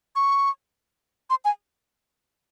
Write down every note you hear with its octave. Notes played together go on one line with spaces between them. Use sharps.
C#6
C6
G#5